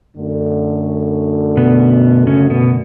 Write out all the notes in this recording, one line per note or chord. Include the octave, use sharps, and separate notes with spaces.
F#2 D3 A3
B2 B3
C#3 C#4
B2 B3